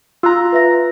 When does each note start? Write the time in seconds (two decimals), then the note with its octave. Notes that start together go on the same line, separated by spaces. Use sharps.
0.23 F4 A#5 E6 F#6
0.52 B4 E5 A#6